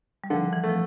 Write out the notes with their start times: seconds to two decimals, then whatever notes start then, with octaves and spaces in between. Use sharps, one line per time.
0.24 G3
0.30 D3 F3
0.53 E3
0.64 A3
0.69 F3